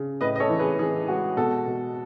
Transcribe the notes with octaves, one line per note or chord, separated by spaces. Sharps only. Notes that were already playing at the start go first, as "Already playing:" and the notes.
Already playing: C#3
A2 B4 D#5
D#5
A4 C#5
E3
G#4 B4
E3 G#4
G#3 F#4
B2 F#4 A4
B2